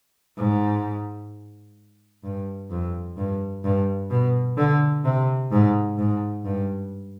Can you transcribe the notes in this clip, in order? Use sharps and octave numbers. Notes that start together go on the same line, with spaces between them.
G#2
G2
F2
G2
G2
B2
D3
C3
G#2
G#2
G2